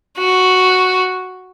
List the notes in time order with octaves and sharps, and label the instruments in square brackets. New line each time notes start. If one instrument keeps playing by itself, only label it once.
[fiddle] F#4